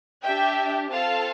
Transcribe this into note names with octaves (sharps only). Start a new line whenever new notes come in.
D4 G4 E5 G5
C4 F4 A4 F5 A5